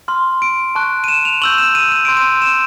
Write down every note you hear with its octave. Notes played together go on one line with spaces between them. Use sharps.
C6 F6
D7
A5 C#6 F#6
D#7
E7
F7
C#6 E6 G6 F#7
E7
D#7
D#7
C6 E6 G6 D7
D#7
E7